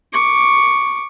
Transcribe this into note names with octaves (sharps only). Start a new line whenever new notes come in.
C#6 D6